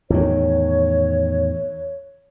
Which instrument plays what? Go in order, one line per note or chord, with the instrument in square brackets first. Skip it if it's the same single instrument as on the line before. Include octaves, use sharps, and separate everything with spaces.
[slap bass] E2 A2 D#3 [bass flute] C#5